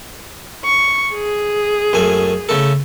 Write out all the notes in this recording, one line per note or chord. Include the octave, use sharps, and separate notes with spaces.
C#6
G#4
F#2 A3 G#5
C#3 A3 A4